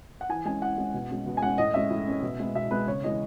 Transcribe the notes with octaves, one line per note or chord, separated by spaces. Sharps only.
F#5
E3 G#5
G#3 C#4 G#5
E3 F#5
G#3 C#4
B2
G#3 C#4
B2
G#5
G#3 C#4 F#5
A2 D#5
G#3 C#4 E5
A2
G#3 C#4
B2
G#3 B3
B2 E5
G#3 B3 B4
C#3 C#5
E3 G#3 D#5